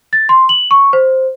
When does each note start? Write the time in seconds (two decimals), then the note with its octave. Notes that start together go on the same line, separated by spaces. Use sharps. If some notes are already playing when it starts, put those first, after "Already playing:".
0.13 A6
0.29 C6
0.49 F#7
0.71 C#6
0.93 C5